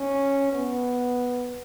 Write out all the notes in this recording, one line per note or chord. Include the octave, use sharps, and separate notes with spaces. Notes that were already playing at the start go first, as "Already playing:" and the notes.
Already playing: C#4
B3